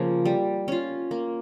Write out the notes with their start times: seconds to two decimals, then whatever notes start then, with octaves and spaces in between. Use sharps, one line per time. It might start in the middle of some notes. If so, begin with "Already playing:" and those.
Already playing: C#3 F3 A#3
0.25 G3
0.68 C#4 F4
1.11 A#3